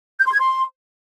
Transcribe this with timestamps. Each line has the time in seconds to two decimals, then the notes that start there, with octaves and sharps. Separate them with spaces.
0.18 G6
0.25 C6
0.32 G#6
0.39 C6